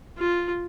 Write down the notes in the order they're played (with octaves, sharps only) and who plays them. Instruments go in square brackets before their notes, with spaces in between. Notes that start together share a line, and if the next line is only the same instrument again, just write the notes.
[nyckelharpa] F4